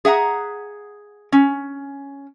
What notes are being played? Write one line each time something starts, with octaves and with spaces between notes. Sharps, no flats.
G#4 E5 F#5 A#5
C#4